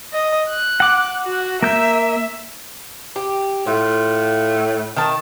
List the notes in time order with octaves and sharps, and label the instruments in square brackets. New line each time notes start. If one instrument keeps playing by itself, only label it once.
[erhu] D#5
F#6
[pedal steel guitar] F#5 D6
[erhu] F#4
[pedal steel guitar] A#3 G6 [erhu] E5
[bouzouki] G4
[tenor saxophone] A2 [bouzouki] F4
[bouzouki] D#3 A5